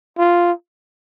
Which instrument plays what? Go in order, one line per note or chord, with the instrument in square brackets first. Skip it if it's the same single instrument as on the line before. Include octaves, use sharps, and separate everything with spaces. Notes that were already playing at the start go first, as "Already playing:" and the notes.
[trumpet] F4